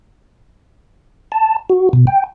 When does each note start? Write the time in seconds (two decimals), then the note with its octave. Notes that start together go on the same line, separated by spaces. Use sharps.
1.32 A5
1.70 F#4
1.93 B2
2.07 G5